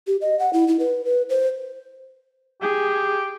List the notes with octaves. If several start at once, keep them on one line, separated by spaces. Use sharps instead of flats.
G4
D#5
F#5
E4
E4
B4
B4
C5
G4 G#4